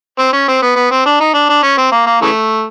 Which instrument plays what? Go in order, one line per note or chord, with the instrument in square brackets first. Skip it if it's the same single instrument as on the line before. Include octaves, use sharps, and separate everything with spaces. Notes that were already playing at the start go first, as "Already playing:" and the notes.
[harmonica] C4
C#4
C4
B3
B3
C4
D4
D#4
D4
D4
C#4
C4
A#3
A#3
C#3 E3 A3